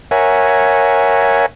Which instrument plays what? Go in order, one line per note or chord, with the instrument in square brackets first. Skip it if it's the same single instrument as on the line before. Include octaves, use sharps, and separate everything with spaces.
[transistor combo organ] A#4 C#5 E5 F#5 G#5